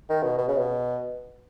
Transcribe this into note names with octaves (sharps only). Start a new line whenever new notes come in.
D#3
B2
B2
C#3
B2